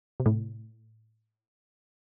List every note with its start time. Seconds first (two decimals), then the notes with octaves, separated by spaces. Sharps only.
0.20 C3
0.26 A2